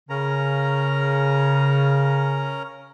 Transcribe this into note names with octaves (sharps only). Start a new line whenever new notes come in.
C#3 C#4 A#4 A#5